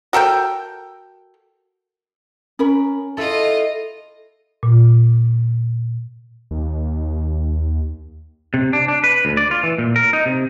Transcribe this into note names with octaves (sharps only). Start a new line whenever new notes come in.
F#4 A4 A#4 G5
C#4 A#4 B5
E4 F4 A4 D#5
A#2
D#2
C3
D4
D4
B4
D2
D5
F4
E3
A#2
A#4
D#4
C3